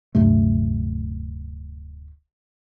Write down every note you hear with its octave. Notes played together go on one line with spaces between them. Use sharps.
D1 G2 C3 A3